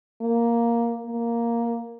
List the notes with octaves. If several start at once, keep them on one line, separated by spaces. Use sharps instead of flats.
A#3
A#3